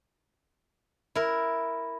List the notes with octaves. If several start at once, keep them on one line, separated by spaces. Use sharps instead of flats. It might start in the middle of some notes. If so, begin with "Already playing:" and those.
E4 A#4